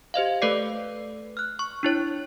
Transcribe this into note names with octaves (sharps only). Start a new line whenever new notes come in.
G4 C5 D#5 F5
A3 A4 B4 D5 D6 C7
F6 F#6
C#6
D4 E4 C#5